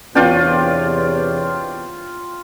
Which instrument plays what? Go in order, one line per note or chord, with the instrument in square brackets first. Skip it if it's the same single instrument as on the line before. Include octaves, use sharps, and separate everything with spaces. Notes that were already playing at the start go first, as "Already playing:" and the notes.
[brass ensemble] E2 C3 C#5 [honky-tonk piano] B3 D4 [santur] F4 G5